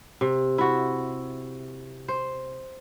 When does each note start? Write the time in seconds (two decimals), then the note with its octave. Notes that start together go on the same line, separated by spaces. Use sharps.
0.21 C3
0.58 E4 F#4
2.08 C5